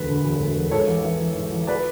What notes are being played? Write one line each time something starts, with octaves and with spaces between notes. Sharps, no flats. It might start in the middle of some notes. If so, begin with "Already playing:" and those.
Already playing: E1 D2 B4
D3
E1
D2
E1
G#2 A4 C#5
A1
E3
A1
G#2
A1
B4 D5